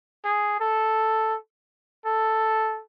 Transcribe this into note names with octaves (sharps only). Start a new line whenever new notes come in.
G#4
A4
A4